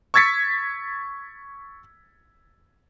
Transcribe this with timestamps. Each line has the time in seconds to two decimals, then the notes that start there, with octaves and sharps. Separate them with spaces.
0.14 C#6 E6 G#6 A6 B6 C#7